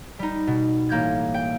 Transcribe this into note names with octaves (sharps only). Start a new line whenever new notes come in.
G3 D#4
B2
A1 A#3 G6 G#6
G5